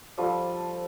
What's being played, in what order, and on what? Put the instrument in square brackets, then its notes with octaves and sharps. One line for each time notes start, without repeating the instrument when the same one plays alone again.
[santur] F3 G3 D4 A4